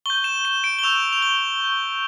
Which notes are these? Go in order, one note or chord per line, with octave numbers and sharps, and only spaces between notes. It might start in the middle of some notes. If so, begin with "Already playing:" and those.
C#6 G6 G7
E7
E7
D7
G7
C#6 E6 G6 F7
F7
G7
C#6 G6